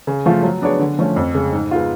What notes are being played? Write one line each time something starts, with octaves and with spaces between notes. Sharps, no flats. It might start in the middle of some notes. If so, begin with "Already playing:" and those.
C#3
F3 A3 F4
F#3
B3 D4 G#4 C#5
D3
F3 A3 C#4
F2
C#3 G#3
G#2
G#3 B3 F4